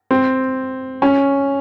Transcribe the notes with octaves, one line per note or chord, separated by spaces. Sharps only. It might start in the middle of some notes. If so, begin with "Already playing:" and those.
C4
C#4